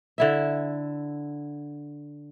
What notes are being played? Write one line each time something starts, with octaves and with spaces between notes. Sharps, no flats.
D3 E4 E5